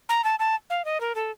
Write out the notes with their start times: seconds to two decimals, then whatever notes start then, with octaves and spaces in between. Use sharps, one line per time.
0.09 A#5
0.24 A5
0.39 A5
0.70 F5
0.85 D#5
1.00 A#4
1.15 A4